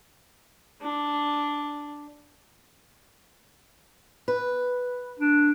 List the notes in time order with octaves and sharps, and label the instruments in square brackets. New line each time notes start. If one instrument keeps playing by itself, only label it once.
[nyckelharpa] D4
[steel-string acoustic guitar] B4
[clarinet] D4